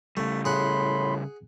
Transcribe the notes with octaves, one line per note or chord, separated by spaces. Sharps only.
C#3 G3 A3
A2 G#4 F#5 B5 C6